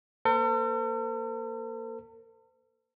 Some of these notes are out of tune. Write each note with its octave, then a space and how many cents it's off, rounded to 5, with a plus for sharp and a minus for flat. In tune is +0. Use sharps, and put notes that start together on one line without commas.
A#3 +0 A4 +45 C5 -40